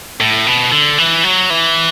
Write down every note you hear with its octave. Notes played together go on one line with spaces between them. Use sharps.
A2
B2
D3
E3
F#3
E3